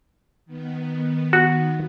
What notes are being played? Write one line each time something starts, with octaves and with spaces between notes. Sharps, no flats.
D#3 B3
F#4